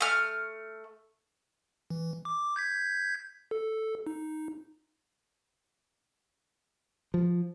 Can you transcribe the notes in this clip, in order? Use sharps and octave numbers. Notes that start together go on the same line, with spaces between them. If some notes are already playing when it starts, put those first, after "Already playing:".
A3 F6
E3
D6
G6 G#6 B6
A4
D#4
F3